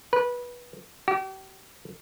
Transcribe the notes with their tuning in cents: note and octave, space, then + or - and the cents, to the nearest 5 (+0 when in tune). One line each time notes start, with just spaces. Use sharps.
B4 -20
G4 -40